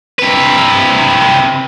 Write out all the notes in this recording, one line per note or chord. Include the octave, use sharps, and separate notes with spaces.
C3 B4